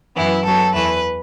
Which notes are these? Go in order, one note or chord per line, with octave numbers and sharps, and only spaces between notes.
F#2 E3 B3 E4
F#2 F#3 B3 A4
E2 E3 A3 B4